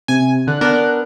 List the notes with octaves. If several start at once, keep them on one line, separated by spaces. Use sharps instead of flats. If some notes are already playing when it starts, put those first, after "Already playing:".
C3 G#5
D3 F#6
B3 D4 A#4